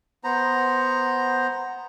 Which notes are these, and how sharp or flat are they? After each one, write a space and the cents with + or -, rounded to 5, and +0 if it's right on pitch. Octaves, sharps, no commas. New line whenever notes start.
B3 +5 C5 +0 A#5 +0